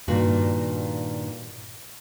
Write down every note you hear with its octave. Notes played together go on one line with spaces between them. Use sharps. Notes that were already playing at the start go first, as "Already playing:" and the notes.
G2 A#2 D#3 F4 F#4